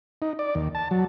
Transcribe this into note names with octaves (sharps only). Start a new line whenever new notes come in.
D#4
D5
D#2
A5
F#3